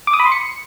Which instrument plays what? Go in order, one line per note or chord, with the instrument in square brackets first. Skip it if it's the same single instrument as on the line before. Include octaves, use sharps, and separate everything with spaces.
[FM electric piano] D6
D#6
B5
C6
C#7